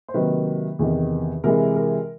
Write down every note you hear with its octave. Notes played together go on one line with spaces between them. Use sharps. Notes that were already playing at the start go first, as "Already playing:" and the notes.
C5
C3 D#3 F#3 A#3 B4
E2 C3 D#3
C3 E3 G#3 A#4
A#4